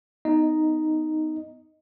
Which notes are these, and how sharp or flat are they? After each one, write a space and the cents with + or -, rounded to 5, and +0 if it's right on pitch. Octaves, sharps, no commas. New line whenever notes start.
B3 +20 D#4 +0 D#5 +0